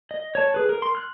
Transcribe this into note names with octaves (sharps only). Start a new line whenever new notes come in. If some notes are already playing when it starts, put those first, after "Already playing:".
D#5
C#5 A5
G#4 B4
A#4
C6
F6 F#6